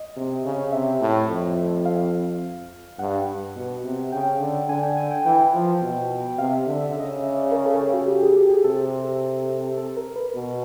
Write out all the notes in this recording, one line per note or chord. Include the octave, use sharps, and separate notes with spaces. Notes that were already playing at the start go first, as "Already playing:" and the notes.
Already playing: D#5
C3
C#3
C3 E5
A2
F2
F5
G2 F#5
B2
C3
C#3 G5
D3
D3 G#5
G5
G#5
G5
E3 G5
F3
B2
C3 F5
E5
D3
E5
C#3 D#5
E5
E5
D5
A#4
A4
G4
F#4
G4
G#4
G4
G#4
C3 A4
A4
A#4
B4
B2